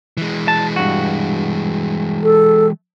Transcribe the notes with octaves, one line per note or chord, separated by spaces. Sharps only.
E3 G#3
A5
G2 F#4
A4